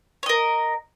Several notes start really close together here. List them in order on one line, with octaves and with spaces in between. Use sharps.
C#5 D#5 A#4